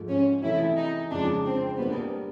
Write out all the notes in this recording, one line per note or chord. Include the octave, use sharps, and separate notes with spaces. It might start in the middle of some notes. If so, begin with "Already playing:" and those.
Already playing: G#2 F3 A3
C#4
C3 E3 A3 E4
D#4
F2 C#3 F3 G#3 D4
C4
G3 A#3 B3 D4